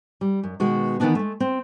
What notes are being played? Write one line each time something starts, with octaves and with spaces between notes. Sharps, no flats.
G3
F#2
B2 D#3 G#3 B3 F#4
D#3 E3 G#3 B3 D4 D#4
G#3 A3
C4